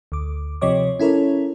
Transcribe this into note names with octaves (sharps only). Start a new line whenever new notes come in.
D2 D6
C3 F3 C#5 D#5 D6
C#4 E4 A4 A#4 C#5